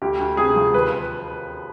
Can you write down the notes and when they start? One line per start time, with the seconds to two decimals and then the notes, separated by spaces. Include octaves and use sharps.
0.02 D2 G4
0.20 D2
0.37 C3 G#4
0.56 F3
0.74 D#2 B4